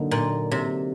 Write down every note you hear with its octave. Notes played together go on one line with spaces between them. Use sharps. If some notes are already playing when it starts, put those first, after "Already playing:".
Already playing: D3 F#3 A#3 D#4
A#2
C3